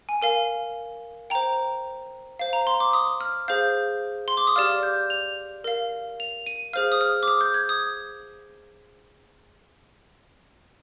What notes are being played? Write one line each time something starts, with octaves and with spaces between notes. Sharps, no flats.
G#5
A#4 F5 G#5
C5 G5 A#5
C5 F5
A#5
C6
D6
D#6
F6
G#4 C5 F5 G6
C6
D6
D#6
G4 D5 F5 F6
G6
F7
A#4 F5
F7
D#7
G#4 C5 F5 F6
D#6
F6
D6
D#6
G6
G#6
D#6